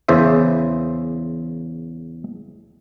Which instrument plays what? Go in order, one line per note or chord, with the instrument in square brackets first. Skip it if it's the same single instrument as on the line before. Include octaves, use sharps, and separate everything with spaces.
[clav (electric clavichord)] E2 C#3 C5 E5